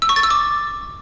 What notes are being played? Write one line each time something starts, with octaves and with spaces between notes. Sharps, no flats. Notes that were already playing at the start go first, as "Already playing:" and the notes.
E6
C#6
A6
E6
D6